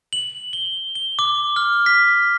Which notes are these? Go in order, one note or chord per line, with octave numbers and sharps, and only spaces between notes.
F#7
G7
G7
D6
F6
B6